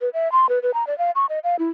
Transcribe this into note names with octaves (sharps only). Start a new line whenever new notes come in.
B4
E5
C6
B4
B4
A#5
D5
F5
C#6
D#5
F5
E4